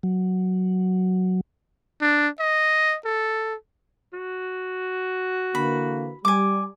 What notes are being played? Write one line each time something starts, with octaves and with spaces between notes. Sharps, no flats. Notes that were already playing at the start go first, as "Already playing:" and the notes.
F#3
D4
D#5
A4
F#4
D3 E3 A#3 B5
G3 G#5 D6